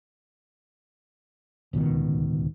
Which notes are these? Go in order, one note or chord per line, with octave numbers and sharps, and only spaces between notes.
D1 C#2 B2 D#3